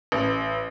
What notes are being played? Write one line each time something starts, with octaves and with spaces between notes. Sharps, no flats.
A1